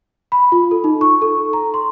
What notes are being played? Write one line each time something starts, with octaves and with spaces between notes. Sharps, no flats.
B5
F4
A4
D#4
C#6
A4
A#5
C6